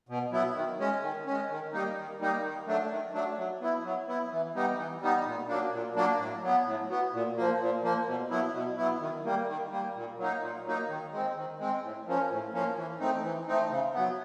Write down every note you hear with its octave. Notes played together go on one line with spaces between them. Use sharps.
B2
F#3 B3 E4
D#3
G#3 C#4
D#3
G#3 C#4
D#3
G3 A#3 D#4
D#3
G3 A#3 D#4
D#3
F#3 A3 D4
D#3
F#3 A3 D4
F#3
B3 E4
F#3
B3 E4
E3
G3 B3 D#4
E3
G3 B3 D#4
A#2
F#3 A#3 D4
A#2
F#3 A#3 D4
A2
F#3 B3
A2
F#3 B3
A#2
F3 A#3
A#2
F3 A#3
B2
F#3 B3 E4
B2
F#3 B3 E4
D#3
G3 A#3
D#3
G3 A#3
A#2
F#3 A#3 D#4
A#2
F#3 A#3 D#4
D#3
G#3 C4
D#3
G#3 C4
A2
F3 A#3 C#4
A2
F3 A#3 C#4
E3
A3 C4 D#4
E3
A3 C4 D#4
C#3
F#3 B3